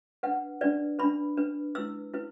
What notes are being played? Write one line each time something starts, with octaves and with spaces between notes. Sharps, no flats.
D4 B4 F#5
D4 B4 D5
D4 B4 B5
D4 B4
E4 B4 E6
E4 B4